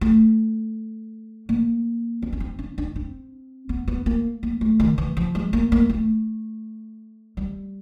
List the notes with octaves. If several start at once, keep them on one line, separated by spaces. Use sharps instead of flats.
A3
A#3
C4
C#4
C4
C#4
D4
C4
B3
B3
A#3
A#3
A3
D#3
E3
F3
G#3
A#3
A#3
A3
G3